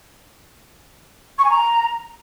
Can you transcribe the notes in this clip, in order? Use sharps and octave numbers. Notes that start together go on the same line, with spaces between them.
C#6
G#5
A#5